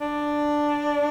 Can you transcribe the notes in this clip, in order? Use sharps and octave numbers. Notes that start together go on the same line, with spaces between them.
D4